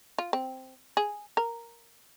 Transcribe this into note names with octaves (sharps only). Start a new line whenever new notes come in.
F4
C4
G#4
A#4